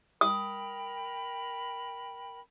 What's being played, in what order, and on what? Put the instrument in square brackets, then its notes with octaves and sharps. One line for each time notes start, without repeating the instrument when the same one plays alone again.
[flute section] A#4 G5 B5 [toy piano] D#6